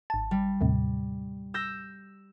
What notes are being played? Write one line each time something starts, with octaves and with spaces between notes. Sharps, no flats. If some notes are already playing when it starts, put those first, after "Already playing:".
G#1 A5
G3
D#2 A2 C3
E6 G6 A#6